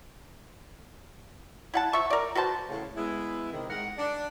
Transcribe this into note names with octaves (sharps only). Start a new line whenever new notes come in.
E4 F#5 A5
F3 E5 C#6
A#4 D5
F#4 B4 C5 A5
A2 C#3
G#3 B3 E4
C3 D#3
G#2 D#3 A#4 F#5
D4